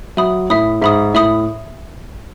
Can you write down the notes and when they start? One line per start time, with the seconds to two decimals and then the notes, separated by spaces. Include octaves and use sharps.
0.17 F#3 E5 B5 D#6
0.50 A2 E5 B5 D#6
0.82 G#2 E5 B5 D#6
1.14 A2 E5 B5 D#6